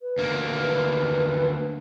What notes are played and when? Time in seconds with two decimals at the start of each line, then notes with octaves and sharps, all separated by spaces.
0.01 B4
0.18 D2 A#3
0.61 B4